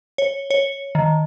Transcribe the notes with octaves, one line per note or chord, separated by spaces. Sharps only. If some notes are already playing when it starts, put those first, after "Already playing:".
C#5
C#5
D#3